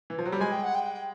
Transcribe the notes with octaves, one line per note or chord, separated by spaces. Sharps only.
E3
F3
F#3
G3
G#3 G#5
G5
F#5
G5